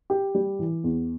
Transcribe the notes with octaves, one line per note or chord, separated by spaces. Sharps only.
G4
G3
E3
E2